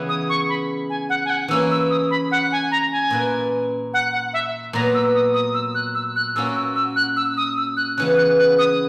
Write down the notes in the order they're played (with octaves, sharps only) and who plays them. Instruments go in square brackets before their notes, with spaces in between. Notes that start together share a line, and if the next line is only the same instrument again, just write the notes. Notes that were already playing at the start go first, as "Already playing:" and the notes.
Already playing: [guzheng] C#3 E3 B3 E4 G#4
[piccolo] D#6
C#6
B5
G#5
F#5
G#5
F#5
[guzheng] E3 A#3 C#4 E4 [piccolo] E6
[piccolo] E6
D#6
B5
F#5
G#5
A#5
G#5
[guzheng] A#2 A#3 E4 B4
[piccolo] F#5
F#5
E5
[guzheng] A#2 F#3 B3 [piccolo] A#5
[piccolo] E6
D#6
D#6
E6
F#6
E6
F#6
[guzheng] A#2 A#3 C#4 F#4 [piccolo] E6
[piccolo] E6
E6
F#6
E6
D#6
E6
F#6
[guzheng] C#3 E3 B3 [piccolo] F#6
[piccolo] F#6
F#6
D#6